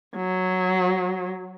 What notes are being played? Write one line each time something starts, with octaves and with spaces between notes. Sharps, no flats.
F#3